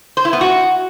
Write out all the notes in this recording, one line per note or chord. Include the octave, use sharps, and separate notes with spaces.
C5
E4
B3
F#4